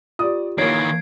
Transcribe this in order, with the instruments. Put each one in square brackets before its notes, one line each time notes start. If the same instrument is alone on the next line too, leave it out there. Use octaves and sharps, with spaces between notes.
[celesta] F4 G4 [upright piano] D5 D#6
[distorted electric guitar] D#3 E3 [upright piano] A#3 C#5 [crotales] G#6 C7 D7